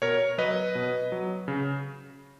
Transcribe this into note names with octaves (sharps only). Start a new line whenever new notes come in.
B2 A#4 C#5
F#3 B4 D#5
B2
F#3
C#3